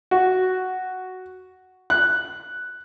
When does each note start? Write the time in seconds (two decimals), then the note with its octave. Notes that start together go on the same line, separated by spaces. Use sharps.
0.11 F#4
1.90 F#6